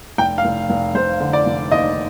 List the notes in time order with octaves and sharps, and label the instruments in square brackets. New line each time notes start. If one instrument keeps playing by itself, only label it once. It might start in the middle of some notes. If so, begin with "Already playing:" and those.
[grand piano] F1 G5
F5
F1
F1
F1 C5
D3
D5
F1
D#2 D#5